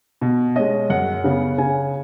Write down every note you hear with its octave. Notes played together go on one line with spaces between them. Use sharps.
B2
G#3 C#4 D#5
F#2 F#5
C#3 B3
C#3 G#5